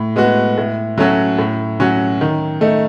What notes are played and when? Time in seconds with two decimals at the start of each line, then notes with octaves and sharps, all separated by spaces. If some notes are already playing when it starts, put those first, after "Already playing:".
Already playing: A2
0.16 G#3 B3 F#4
0.58 A2
0.98 F#3 A3 C#4 F#4
1.39 A2
1.80 F#3 C#4 F#4
2.21 D#3
2.61 A3 D#4